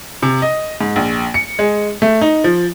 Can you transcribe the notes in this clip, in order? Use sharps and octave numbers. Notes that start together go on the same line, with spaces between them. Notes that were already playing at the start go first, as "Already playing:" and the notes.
C3
D#5
G#2
A#1
C#7
G#3
A3
D#4
F3